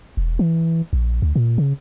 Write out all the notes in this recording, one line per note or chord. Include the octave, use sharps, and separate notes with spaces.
E1
E3
A#1
D2
A#2
C#3